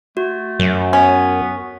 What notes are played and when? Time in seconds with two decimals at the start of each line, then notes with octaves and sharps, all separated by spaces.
0.17 A3 F#4
0.60 F#2
0.93 B3 C#4